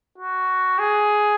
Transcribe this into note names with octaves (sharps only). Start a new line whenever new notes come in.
F#4
G#4